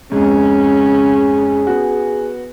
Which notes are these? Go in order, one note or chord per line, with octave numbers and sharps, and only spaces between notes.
F2 G#2 C#4 G#4
B3 F#4